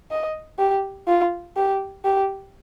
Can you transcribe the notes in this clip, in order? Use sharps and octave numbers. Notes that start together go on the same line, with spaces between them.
D#5
G4
F4
G4
G4